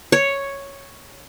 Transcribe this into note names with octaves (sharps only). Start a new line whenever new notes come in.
C#5